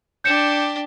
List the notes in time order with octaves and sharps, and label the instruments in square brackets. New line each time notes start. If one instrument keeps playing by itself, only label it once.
[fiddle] D4 G4 [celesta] G6 C#7 E7